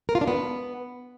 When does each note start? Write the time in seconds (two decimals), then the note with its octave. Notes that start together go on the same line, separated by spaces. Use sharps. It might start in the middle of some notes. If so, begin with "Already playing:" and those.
0.09 A#4
0.15 F4
0.21 D4
0.28 B3